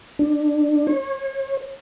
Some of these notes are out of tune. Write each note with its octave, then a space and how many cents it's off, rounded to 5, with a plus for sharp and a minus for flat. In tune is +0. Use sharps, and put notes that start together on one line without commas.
D4 +15
C#5 -35